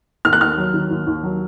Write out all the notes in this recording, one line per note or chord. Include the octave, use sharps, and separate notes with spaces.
D#2 F6
F#6
D#2 F6
F#3
D#3
D#2
D#2
F#3